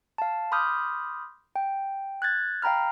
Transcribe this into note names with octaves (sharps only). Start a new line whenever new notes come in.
F5 A5
B5 C6 D6 D#6 F6 G6
G5
F#6 G#6 A6
F5 G5 A#5 B5 F6